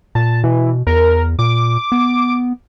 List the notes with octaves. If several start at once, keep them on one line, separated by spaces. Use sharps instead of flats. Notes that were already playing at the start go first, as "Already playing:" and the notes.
A#2 A5
B2 E3
E2 A#4
A#2 D6
B3